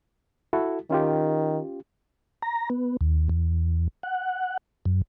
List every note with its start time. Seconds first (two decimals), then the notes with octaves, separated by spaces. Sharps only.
0.53 E4 F#4 A4
0.91 D#3 C#4 F4 G4
2.42 A#5
2.70 B3
3.01 D#2
3.29 E2
4.03 F#5
4.85 F#2